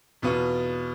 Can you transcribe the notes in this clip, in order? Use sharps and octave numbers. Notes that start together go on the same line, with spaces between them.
E2 B2 B3 F4